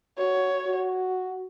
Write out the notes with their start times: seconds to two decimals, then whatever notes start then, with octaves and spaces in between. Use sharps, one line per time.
0.18 F#4 C#5
0.66 F#4